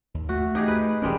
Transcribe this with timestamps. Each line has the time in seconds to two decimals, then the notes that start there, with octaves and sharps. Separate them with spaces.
0.14 D#2
0.29 A3 F#4
0.55 D#4 G4 G#4
0.68 B4
1.02 E1 G3 G#3 C#4 A#4